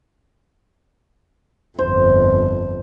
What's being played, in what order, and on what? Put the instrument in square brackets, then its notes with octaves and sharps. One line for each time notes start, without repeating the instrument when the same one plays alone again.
[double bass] G1 F2 [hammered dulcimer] C5